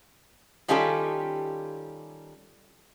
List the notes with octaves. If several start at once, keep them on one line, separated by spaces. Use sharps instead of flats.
D#3 G3 C#4 F4 G4 A4